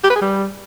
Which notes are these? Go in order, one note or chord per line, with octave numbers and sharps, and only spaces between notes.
G4
B4
G#4
G3